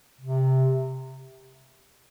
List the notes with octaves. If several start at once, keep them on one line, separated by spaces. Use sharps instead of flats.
C3